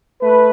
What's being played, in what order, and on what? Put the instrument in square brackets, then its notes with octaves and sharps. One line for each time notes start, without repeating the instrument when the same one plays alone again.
[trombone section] A3 B4